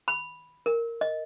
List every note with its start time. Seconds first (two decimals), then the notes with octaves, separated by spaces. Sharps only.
0.08 B5
0.66 A#4
1.01 D#5